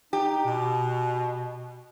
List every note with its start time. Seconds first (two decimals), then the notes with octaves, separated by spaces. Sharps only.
0.13 D#4 G4
0.45 B2